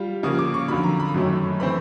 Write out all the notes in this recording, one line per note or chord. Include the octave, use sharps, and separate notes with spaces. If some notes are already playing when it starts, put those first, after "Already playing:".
Already playing: G3 F4
C#3 F3 A#3 D#6
D6
C#6
F2 D3 F#3 B5
A#5
B5
F#2 D#3 F#3 A3 C#4
E3 A3 C4 B5